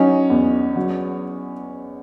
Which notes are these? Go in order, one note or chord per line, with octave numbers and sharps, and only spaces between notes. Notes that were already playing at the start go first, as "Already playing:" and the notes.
Already playing: F#3 C#4 D#4
E2
F#3